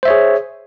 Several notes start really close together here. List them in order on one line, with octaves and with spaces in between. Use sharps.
C5 E5 C#5 G#4